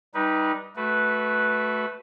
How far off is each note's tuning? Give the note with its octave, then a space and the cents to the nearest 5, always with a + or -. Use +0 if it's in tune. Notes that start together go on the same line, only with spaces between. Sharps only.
G3 +0 D#4 +10 B4 -20
A3 -15 F#4 +5 B4 +0